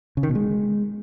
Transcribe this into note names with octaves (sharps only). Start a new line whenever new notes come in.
C#3
D#3
B2
G#3